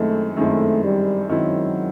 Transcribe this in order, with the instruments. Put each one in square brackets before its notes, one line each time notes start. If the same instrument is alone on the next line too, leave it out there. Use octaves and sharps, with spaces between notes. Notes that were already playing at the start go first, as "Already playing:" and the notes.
Already playing: [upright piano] F#2 D#3 G#3 C4 E4 [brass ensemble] A3
[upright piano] F#2 D#3 G#3 C4 E4 [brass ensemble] A3
[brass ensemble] G3
[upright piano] F#2 D#3 G#3 C4 E4 [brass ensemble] F#3